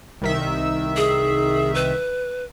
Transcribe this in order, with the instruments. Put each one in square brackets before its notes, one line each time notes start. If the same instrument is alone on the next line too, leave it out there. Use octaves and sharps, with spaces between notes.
[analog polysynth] C2 D#3 E5
[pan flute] G#4
B4